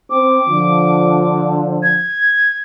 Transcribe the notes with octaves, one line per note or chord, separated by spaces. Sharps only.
C4 D6
D3 F3
G#6